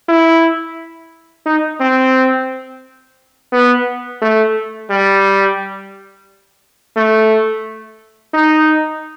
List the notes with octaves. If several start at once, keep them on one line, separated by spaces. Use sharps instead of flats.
E4
D#4
C4
B3
A3
G3
A3
D#4